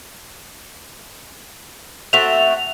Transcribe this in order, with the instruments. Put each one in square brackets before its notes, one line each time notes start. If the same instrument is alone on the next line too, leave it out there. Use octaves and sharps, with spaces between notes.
[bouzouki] A3 C4 F#4 [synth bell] F7